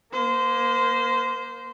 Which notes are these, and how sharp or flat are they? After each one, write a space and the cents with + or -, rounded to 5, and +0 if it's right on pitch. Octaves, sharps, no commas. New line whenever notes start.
A#3 +20 C5 -20